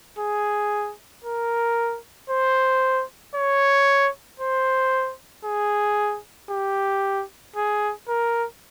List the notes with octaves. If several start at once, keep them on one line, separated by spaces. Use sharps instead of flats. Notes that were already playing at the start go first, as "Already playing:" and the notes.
G#4
A#4
C5
C#5
C5
G#4
G4
G#4
A#4